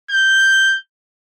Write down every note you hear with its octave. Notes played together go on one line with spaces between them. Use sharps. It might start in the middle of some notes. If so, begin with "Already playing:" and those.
G6